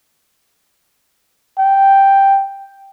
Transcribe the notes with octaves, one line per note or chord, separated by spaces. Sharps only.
G5